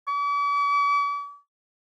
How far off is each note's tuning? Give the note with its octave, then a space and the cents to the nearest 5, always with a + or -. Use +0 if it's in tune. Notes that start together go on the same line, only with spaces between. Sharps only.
D6 -45